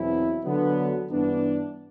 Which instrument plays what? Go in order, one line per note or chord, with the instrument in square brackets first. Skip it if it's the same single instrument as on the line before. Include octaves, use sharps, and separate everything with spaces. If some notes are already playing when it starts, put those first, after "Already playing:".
Already playing: [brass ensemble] E2 B2 F#3 C4 E4
D3 F#3 B3
G2 E3 B3 D4